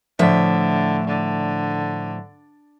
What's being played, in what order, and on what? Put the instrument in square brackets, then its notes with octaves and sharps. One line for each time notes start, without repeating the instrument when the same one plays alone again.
[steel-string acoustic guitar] A2 F3 E5 [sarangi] D3
[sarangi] D3